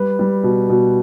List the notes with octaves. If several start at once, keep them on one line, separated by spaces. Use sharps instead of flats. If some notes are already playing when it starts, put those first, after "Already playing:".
Already playing: G3 B4
G3
B2
B2